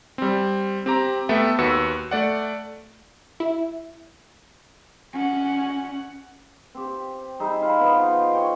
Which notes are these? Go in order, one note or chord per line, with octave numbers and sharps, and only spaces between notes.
G3 C4
C4 G4 A#5
A3 B3 A4 E5 G5
D#2 F#4 B4 E6 C#7
A3 D5 F#5
E4
C#4 F#5
C4 G4
G3 D#4 G#4 E5
F4 F5 B5
F3 B3
C5
C#5 G5